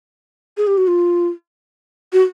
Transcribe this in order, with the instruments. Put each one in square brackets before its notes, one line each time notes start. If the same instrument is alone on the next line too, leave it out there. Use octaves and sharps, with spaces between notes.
[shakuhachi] G#4
G4
F#4
F4
F#4